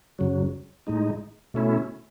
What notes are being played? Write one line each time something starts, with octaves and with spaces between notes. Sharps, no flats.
F#2 C#3 F#3
A2 G#3 D#4
B2 A3 C#4 E4